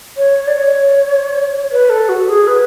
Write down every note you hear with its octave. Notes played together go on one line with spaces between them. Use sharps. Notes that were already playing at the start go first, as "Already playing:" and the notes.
C#5
D5
C#5
B4
A4
F#4
G#4
B4